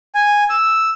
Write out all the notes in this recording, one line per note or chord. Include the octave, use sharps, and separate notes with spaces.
G#5
E6